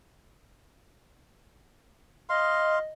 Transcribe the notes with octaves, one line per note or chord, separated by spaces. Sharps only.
D#5 F5 C6